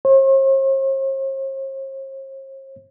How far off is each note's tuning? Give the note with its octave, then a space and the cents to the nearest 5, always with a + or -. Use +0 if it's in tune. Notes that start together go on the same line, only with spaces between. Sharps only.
C5 +45